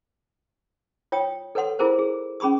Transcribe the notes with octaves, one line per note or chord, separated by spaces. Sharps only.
F4 C#5 G5 D#6
A4 B4 C#5 F#5 C6
E4 F4 G#4 A#4 C5
G#4
C#4 G#4 B5 C#6 D#6